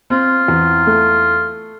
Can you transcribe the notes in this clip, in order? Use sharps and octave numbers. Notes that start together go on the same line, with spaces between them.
C4 F4
E2
A3